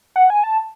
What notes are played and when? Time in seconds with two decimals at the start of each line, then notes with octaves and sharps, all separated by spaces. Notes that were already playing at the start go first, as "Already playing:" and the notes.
0.16 F#5
0.30 G#5
0.44 A5